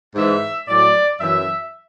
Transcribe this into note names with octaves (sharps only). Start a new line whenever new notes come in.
G#2 E3 E5
A2 F#3 D5
F#2 E3 E5